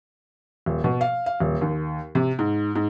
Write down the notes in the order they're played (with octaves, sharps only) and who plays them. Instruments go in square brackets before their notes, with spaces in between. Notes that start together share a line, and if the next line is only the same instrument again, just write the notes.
[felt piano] D#1
B2
F5
F5
D#1
D#2
C3
G#2
G#2